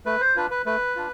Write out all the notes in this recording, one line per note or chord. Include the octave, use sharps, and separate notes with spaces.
A3 B4
C5
D4 F4 B4
B4
A3 B4
D4 F4